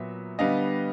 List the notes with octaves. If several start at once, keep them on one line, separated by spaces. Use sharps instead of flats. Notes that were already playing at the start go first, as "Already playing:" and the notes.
Already playing: A#2 F#3 B3 E5
D3 G3 B3 D#5 F5